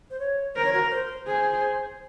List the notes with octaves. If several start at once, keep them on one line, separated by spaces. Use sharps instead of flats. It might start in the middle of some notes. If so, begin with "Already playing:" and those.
C5
C#5
A#4 C5
C#5
F#4
A#4
C5
G#4 C5